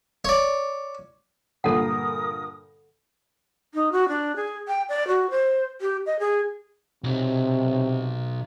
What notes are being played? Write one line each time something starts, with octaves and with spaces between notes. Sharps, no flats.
C#5 D5
G2 A#2 D3 A4 A#4 F#5 D#6
D#4
F#4
D4
G#4
G5
D5
F#4
C5
G4
D#5
G#4
B1 C3